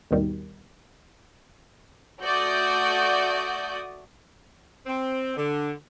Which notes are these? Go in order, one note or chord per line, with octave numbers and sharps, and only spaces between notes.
G#1 D#2 B2 D#3 G3
A3 F#4 D5 D#6 G6
C4
D3